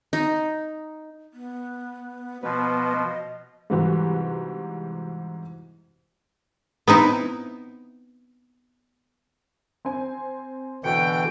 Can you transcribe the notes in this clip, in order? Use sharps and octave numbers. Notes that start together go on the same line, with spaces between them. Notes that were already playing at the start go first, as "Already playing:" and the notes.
D#4
B3
B2 F3 B3 D#5
G#2 C3 E3 G3 F#4 G4
B3 C4 D#4 E4
C4 C5 G#5
B2 D3 E3 G5 C#7